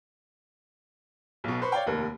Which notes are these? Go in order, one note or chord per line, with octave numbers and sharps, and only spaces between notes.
B1 B2
B4 C5 B5 C#6
C#5 D5 F5 G5
F1 D#2 A#4